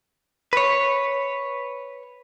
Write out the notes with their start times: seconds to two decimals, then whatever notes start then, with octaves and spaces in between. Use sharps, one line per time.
0.53 B4 C#5